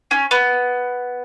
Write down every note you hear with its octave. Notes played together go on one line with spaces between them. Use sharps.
C#4
B3